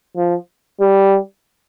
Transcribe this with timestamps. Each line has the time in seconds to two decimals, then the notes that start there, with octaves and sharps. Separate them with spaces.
0.17 F3
0.80 G3